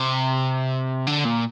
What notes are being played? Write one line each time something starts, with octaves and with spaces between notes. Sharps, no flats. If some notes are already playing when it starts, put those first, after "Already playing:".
Already playing: C3
D3
A#2